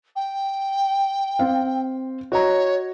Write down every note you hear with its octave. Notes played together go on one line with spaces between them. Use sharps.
G5
C4 F5
F#4 C#5 D#5 A#5